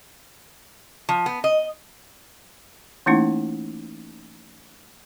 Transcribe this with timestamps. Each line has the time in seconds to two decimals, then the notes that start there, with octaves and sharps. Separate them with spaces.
1.09 F3
1.26 B3
1.44 D#5
3.06 E3 A3 A#3 C#4 D#4 E4